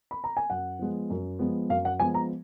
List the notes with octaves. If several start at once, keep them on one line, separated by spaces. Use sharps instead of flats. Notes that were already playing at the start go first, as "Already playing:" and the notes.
B5
A#5
G#5
F#2 F#5
F3 G#3 B3
F#2
F3 G#3 B3
F#2 F5
F#5
F3 G#3 B3 G#5
A#5